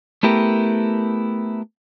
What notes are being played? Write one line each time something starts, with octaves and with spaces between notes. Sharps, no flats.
A3 B3 E4 G4 A#4